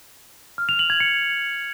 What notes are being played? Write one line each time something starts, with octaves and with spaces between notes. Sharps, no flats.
F6
F7
F#7
G#6
C#7